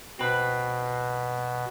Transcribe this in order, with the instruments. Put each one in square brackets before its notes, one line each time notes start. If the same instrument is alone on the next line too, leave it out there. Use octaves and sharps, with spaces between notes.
[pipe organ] B2 [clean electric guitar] C4 B4